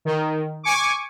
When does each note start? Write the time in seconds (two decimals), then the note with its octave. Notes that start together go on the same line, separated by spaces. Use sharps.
0.05 D#3
0.63 G#5 C#6 D6